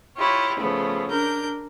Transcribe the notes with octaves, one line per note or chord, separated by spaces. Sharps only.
E4 F4 G4 C#5
C#3 F3 A3 B3
D4 A#4 G6